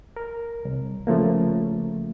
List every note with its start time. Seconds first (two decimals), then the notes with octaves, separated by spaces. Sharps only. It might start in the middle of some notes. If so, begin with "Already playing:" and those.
0.16 A#4
0.65 C2
1.07 C#3 F3 A3 A#3